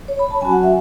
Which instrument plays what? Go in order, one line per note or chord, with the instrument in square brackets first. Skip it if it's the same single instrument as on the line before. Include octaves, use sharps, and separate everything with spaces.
[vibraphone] C#5
B5
A5
F#3 C#4 F#4 G#5
F#5
E5